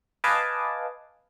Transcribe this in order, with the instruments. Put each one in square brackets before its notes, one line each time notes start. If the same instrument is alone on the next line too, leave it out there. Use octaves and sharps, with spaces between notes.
[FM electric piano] B4 D#5 F5 G#5 A5 D6